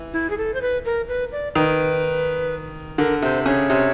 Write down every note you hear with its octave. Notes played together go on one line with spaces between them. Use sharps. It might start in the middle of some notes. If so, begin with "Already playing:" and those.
Already playing: E3
E4
G#4
A4
C5
B4
A#4
B4
D5
D#3 B4
D3 A#4
C3 C5
C#3 C#5
C3